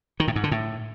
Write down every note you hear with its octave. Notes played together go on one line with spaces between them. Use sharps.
D#3
A2
G#2
D3
A2